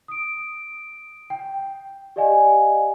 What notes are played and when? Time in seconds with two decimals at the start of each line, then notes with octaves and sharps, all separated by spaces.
0.08 D#6 D7
1.30 G5
2.16 G4 D5 D#5 F5 G#5